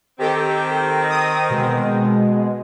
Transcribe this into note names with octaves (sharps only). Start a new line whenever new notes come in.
D#3 C4 G4 A4
D#6
B2 G#3